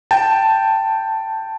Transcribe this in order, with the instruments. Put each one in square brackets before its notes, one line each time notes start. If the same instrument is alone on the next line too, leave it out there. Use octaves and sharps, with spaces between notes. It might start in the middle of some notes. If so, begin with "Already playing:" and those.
[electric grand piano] G5 A5